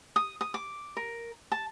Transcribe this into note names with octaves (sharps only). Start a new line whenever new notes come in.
D#6
D#6
D6
A#4
A5